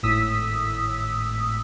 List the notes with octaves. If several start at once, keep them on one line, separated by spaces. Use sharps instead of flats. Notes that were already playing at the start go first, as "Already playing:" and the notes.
G#1 A2 D#6 E6 B6